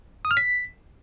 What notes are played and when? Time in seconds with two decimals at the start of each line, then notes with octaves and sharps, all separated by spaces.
0.25 D#6
0.31 F6
0.37 B6